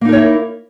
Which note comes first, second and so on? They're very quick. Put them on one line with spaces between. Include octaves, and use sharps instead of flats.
A#3 D#4 A#4 C#5 E4